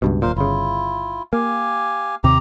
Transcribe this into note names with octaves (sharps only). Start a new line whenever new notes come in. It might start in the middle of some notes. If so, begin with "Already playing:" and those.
C#2 G2 B2
D1 A#2 A#4 C5 F5
G1 C#3 E4 F4
A#3 G4 F5 G#5
D#2 C3 G4 A#5